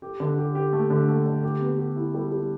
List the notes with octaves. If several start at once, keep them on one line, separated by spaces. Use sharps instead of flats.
G4
D3
G4
G4
A3
D3
A3
D3
G4
B3
G4
E4
G3
G3